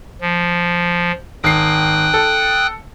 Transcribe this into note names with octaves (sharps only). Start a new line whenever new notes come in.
F3
G#1 G5 D#6 F#6 C7
A4